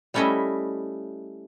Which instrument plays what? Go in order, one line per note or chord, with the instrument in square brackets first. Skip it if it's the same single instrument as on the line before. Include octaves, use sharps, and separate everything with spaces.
[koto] G3 A3 C#4 E4 D#5 E5